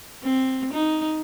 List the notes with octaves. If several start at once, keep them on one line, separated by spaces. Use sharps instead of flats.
C4
D#4